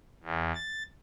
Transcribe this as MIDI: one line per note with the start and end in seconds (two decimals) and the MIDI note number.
0.23 0.52 40
0.55 0.83 93